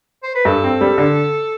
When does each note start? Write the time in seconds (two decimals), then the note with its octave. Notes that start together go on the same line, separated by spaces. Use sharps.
0.23 C5
0.35 B4
0.45 G2 A4
0.64 C4
0.81 G3
0.98 D3